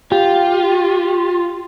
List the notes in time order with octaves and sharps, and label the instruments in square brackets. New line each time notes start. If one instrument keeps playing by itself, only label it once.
[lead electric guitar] F4 [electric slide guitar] G4